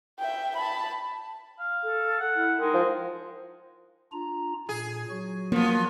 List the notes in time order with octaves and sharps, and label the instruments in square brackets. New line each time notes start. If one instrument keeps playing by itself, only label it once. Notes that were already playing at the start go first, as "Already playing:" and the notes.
[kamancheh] E5 G5
A5 B5
[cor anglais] F5
[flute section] A4
[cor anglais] F#5
[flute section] E4
[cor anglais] G#3 [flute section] D#4 A#4 G5
[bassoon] F3
[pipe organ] D4 F4 A#5
[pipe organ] A#2 [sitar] G#4
[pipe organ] F#3 F#4
[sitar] F3 B3 [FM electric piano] A#3